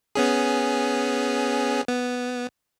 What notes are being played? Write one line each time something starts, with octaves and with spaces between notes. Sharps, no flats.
B3 C#4 G#4
B3